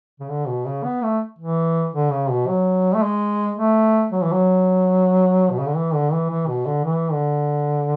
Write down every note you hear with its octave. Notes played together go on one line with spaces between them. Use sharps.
C#3
D3
B2
C#3
B3
A3
E3
D3
C#3
B2
F#3
A3
G#3
A3
F#3
E3
F#3
B2
C#3
D3
E3
D3
E3
E3
B2
D3
E3
D3